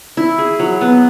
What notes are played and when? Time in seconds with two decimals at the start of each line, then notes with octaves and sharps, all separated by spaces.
0.17 E4
0.38 G#4
0.59 F#3
0.81 B3